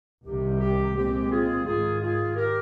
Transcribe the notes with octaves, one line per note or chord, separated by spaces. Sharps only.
C2 C3 D#3 G3 G4
G4
A#2 G#3 C4 G4
F4 G#4
G#2 D#3 G#3 F4 G#4
F4 G#4
G4 A#4